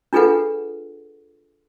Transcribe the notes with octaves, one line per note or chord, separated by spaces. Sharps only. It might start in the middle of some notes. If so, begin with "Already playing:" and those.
D4 F4 G#4 A4 B4 F#5